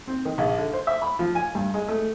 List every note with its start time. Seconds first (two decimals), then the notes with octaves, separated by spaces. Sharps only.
0.07 C4
0.25 D#3
0.38 A#1
0.58 D3
0.73 C5
0.87 E5
1.02 B5
1.19 F3
1.35 G#5
1.55 G2
1.74 G#3
1.88 A3